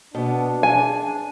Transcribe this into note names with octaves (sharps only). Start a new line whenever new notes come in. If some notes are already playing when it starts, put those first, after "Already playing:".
B2 B3 D4
G#4 G#5